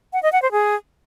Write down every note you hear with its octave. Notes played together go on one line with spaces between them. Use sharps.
F#5
D#5
F#5
C5
G#4